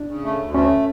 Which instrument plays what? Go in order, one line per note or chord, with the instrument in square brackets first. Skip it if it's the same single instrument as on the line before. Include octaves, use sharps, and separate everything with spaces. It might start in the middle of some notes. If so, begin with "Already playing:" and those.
Already playing: [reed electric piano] D4
[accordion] C#3
A3
D2
[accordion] A3 [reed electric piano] C#4